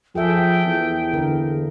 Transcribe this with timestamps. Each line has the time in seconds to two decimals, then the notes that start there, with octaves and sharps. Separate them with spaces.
0.15 F3 G#4 A4 E5 G5
0.65 E2
1.13 D3 A#4